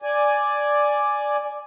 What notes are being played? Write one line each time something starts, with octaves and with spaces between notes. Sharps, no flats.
D5 G#5